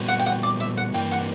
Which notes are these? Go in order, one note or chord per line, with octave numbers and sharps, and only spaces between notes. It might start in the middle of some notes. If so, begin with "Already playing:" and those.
Already playing: A#2 G3 B3 F#4
F#5
G5
F#5
D5
E5
F#5
G2 E3 A#3 G5
F#5